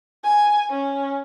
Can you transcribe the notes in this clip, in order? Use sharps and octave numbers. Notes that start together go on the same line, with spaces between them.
G#5
C#4